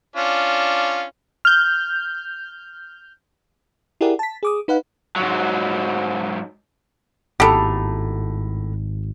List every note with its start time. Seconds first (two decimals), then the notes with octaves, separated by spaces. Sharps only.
0.16 C#4 D4 F4
1.45 F6 G6
4.01 E4 G4 G#4 A#4 D5 F#5
4.19 A5 B6
4.43 G#4 D6 D#6
4.68 D#4 B4 F5 F#5
5.16 G#2 F#3
7.40 G#1 A2 B3 G4 A4 A#5